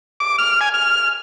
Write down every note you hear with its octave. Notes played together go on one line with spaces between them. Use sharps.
D6
F6
G#5
F6